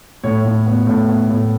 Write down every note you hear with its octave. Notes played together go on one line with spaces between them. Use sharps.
A2 C#5
A2
B3
A2
B3
A2